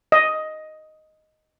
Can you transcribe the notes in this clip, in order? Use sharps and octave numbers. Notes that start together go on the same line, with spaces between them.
D#5